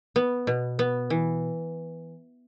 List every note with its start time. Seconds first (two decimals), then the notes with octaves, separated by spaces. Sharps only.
0.16 B3
0.47 B2
0.79 B3
1.10 E3